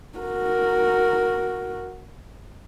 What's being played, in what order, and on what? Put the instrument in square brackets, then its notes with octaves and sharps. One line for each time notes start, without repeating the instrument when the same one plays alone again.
[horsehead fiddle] F#4 A#4